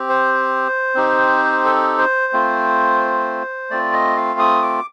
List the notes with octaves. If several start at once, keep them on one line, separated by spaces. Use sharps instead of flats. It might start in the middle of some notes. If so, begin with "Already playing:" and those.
Already playing: C4 G4
C5
C4 D#4 G4
A4
C5
A3 C4 F4
A3 C4 F4 D5
D#5
F5
D#6
D6